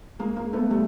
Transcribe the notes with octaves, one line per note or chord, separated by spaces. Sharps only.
G#3 A#3
G#3 A#3
A3 B3
G3 A3